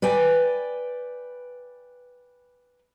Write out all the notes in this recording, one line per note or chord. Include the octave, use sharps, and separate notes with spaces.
B4 D5 G5 G#5